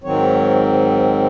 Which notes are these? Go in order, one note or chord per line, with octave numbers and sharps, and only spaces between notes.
G#2 D#3 F#3 C4 C#5